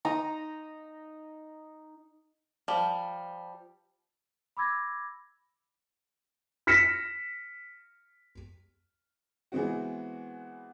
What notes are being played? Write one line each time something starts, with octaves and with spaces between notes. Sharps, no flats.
D#4 A#5 D#6
F3 G3
B5 D6 E6 G#6 A#6
F6 A#6 B6 C#7 E7
E3 G#3 B3 C4 F#4